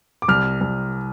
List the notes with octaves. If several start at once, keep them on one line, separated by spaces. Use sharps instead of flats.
D6
C2 F6
C2